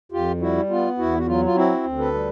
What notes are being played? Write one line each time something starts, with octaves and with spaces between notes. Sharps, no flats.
F2 F4 G4
G3 E4 F#4
B3 F4
E2 E4 F#4
F#4
F#3 F4
F4
C4 E4 F#4
D2
A4 B4
G3